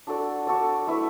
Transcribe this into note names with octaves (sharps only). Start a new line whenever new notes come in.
D4 F#4 A4 D5
D4 F#4 A4 D5
A3 E4 B4